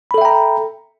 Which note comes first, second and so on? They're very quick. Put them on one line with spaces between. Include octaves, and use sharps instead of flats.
B5 A4 E5 G5 A#5